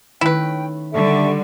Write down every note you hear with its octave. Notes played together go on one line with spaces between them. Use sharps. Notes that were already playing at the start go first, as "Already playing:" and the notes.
D#3 A3 C#4 E4 B4 G5
D3 G3 A4 E5 C#6